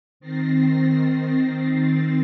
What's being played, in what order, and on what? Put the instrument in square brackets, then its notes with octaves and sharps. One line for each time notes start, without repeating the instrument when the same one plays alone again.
[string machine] D#3 C4 A6 A#6 C7